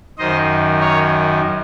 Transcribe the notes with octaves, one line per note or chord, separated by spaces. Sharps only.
F#2 D#3 C5 D#5
A#4 C#5